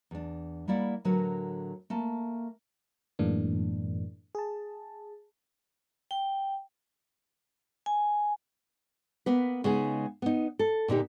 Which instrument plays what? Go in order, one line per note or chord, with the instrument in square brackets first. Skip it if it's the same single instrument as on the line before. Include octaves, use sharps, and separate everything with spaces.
[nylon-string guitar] E2 D4
G3 A#3 E4 D5 F5 F#5
A2 D3 F#3 F#4 A#4 B4
A3 A#3 A5
[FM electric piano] F#2 A2 E3 G#3 A#3 D4
G#4 A5
[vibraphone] G5
G#5
[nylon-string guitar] A#3 B3 B4
C#3 G#3 B3 D#4 G#4
B3 D#4
A4
A#2 D3 D#4 G4